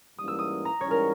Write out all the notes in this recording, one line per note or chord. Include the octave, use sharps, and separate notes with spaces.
G#2 E3 G3 A#3 C#4 D#6
E6
D#6
A#5
G#2 E3 G3 C#4 C#5
A#4